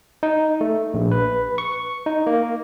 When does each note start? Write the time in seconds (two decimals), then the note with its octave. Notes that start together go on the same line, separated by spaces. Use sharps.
0.23 D#4
0.61 A3
0.94 A#1
1.12 B4
1.58 C#6
2.06 D#4
2.27 A#3